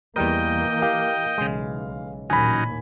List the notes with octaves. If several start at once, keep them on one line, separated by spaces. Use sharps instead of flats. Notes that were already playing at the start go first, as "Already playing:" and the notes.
E2 E3 G3 A#3 A#4 D#5 G5
G4 F5
B1 C#3 E3 G#3
A1 D#2 A#2 F#3 C#4 D#4 G#5 B5